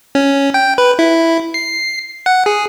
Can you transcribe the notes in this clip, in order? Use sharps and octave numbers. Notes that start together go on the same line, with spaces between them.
C#4
G5
B4
E4
C7
F#5
G#4